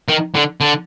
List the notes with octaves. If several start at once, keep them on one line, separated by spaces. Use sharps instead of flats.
D#3
D3
D3